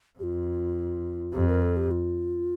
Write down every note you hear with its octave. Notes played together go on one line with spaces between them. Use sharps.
F2 F4 G4
F2 G4
A#4
A4
G4
F4